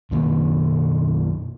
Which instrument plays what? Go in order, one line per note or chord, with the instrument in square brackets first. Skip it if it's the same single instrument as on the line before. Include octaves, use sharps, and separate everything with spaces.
[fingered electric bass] F#2 B2 D#3 A#3